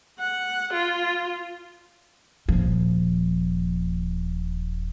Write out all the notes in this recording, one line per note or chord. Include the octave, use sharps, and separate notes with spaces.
F#5
F4
D#1 F3